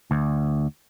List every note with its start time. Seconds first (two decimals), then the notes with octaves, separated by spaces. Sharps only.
0.11 D2